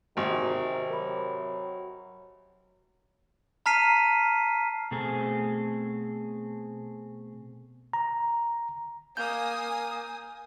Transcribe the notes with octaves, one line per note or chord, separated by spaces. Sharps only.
G#1 C3 D#3 F#4
F#3 A#4 B5
A5 A#5 F6 B6 C7 D#7
B2 A3 C4 G#4 A4
A#5
A#3 G#5 D#6 G6